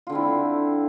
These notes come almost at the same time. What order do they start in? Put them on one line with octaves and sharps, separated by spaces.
F4 D3 C4 E4